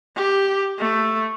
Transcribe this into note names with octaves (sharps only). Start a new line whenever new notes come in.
G4
A3